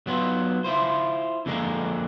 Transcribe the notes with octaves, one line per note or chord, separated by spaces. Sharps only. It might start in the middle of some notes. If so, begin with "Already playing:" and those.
F#3 B3 F4
E4 F4 C5
F2 D3 G#3 A#3